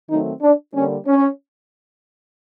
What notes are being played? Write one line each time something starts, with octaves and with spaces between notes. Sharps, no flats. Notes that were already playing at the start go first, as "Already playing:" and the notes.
D#3 F#3 A3 C4 D#4
D4
D3 G3 A#3 C#4
C#4